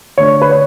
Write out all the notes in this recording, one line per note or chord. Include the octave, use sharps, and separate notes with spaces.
D3 A3 D4 C#5
B4
C#5